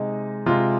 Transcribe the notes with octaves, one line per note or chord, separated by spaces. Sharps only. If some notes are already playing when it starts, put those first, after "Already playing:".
Already playing: C3 G#3 D#4
C3 G#3 F4